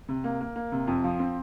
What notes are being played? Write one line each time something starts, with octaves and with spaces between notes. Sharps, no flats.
C3
A#3
A#3
A#3
C3
F2
F3
C4